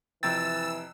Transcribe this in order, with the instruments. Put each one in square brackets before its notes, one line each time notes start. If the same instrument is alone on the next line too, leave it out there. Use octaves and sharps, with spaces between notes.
[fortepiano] F2 C3 G5 [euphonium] E3 [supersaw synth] E6 [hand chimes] A6